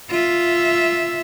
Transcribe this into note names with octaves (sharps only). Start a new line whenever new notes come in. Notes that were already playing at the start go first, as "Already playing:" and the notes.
F4 E5